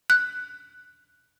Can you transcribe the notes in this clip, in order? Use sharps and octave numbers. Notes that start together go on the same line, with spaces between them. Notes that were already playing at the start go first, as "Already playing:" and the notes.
F#6